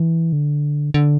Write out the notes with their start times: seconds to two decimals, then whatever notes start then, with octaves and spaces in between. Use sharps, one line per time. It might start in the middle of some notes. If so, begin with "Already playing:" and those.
Already playing: E3
0.33 D3
0.94 D3